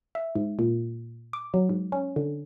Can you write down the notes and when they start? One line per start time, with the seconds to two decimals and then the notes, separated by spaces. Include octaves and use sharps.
0.15 E5
0.35 G#2
0.59 A#2
1.33 D6
1.54 F#3
1.69 G#2
1.92 C#4
2.16 D3